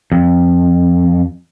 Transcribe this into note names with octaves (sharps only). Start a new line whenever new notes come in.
F2